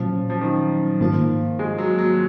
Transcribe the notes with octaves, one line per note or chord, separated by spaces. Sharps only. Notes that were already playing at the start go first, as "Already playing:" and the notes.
Already playing: A#2 F3 F#3 C#4
F3
D#3
G#2 D#3 F3 A#3 F4
G#3
F#3
F#3